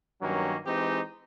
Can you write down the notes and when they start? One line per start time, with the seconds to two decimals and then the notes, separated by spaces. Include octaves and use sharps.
0.21 G2 D#3 F#3 A#3 C#4
0.65 E3 G#3 C4 D#4 G4